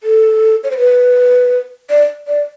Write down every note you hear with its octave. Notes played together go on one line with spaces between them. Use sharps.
A4
C#5
C5
B4
D5
D5